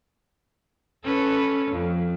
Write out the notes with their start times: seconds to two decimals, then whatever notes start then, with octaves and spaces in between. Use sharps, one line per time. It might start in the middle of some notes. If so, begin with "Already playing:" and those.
1.04 C#4 A4 B4
1.72 F2